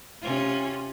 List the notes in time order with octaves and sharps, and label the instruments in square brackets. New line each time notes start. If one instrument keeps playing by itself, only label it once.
[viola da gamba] C3 C#4 F4